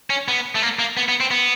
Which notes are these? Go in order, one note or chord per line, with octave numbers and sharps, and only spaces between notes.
C#4
B3
A3
A#3
A#3
B3
B3
C4
B3